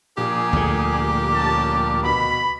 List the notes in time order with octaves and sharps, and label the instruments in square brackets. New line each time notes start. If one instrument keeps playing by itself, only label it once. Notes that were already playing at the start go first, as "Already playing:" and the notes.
[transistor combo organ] A#2 F3 D4 [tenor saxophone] G4 [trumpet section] G#4
[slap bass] D2 A3
[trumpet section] C#4 A5
[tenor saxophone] B2 [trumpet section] B5